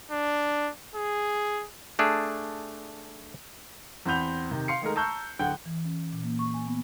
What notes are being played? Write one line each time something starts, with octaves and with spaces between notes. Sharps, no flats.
D4
G#4
A3 D4 G#4
E2 C4 F#5 B5 G6 F7
C3 D#3
F5 C6 C7 C#7
D#3 G#3 A3 A#4
A5 A#5 C#6 E6 F#6 G6
D1 D3 F#5 G5 G6
E3
C#4
A#2
A#3
C#6
G#5
B3